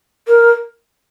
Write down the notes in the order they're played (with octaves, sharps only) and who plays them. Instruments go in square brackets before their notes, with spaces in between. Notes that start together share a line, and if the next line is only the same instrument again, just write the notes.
[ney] A#4